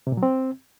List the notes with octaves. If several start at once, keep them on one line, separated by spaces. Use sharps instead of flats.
C3
A#2
F#3
C4